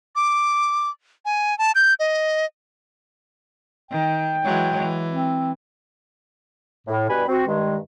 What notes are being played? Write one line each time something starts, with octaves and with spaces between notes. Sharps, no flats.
D6
G#5
A5
G6
D#5
D#3 G5
E3 F#3 G#3
E3
C4
A2
G2 B2 G3 B4 G#5 B5
C4 F#4
G2 D#3 G#3